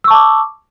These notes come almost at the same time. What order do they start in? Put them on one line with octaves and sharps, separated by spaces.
E6 C#6 A5 D6